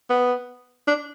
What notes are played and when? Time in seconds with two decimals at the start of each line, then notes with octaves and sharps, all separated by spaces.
0.10 B3
0.88 D4